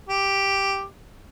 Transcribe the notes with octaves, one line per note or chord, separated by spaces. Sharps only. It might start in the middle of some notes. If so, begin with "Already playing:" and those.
G4